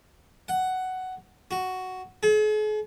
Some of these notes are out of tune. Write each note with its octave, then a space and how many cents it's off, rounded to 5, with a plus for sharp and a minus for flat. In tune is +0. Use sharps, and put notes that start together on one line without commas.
F#5 +10
F#4 +5
G#4 +45